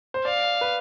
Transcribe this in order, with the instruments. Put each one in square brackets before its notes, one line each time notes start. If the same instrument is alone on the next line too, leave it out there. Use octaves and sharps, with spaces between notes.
[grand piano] C5
[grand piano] D5 [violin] F5
[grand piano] B4